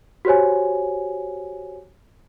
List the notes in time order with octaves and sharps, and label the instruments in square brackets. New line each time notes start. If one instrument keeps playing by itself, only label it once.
[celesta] F#4 G4 C5 C#5 G#5